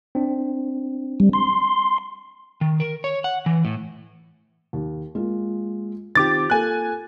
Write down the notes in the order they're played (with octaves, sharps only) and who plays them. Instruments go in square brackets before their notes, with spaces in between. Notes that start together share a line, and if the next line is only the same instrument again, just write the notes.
[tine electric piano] C4 D4
[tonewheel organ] G3
C6
[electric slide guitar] D#3
A#4
C#5
F#5
E3
A2
[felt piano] D#2
G#3 A#3 F4
[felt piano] D#3 C4 F4 [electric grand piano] G4 D6 A6
[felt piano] A#3 F4 A4 [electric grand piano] G#5 F#6